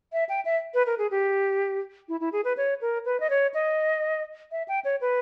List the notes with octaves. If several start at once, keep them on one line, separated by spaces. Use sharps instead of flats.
E5
G5
E5
B4
A#4
G#4
G4
E4
E4
G#4
B4
C#5
A#4
B4
D#5
C#5
D#5
E5
G5
C#5
B4